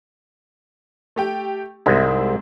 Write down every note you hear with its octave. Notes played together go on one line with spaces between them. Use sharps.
A3 G4 G5
C2 G#2 G#3 C4 E5